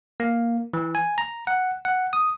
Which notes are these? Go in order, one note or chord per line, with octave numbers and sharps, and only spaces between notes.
A#3
E3
G#5
A#5
F#5
F#5
D#6